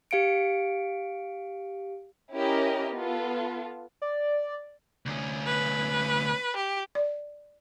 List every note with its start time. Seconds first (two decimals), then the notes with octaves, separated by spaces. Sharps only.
0.11 G4 F5 C#7 D7
2.34 C#4 E4 G4 A#4 D#5
2.93 B3 F4 A4
4.02 D5
5.06 D2 C#4
5.46 B4
6.56 G4
6.95 D5